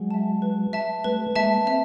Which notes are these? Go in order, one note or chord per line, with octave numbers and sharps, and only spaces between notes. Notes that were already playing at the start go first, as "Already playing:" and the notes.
Already playing: F#3 G#3
E5 A5
B4
E5 A5
G3 A3 B4
G#3 A#3 E5 A5
A#3 C4 E5